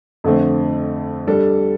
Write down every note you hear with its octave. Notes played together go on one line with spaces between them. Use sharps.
F2 D3 A3 C4
G3 D4 A4